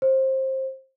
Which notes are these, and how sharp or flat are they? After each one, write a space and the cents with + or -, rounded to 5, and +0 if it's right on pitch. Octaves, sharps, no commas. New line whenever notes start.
C5 +20